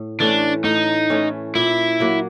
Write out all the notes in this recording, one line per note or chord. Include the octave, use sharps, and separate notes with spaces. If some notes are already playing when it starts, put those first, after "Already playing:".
Already playing: A2
E3 A3 C#4 D4
A2 D#4
E3 A3 C#4
A#2 E4
F#3 A#3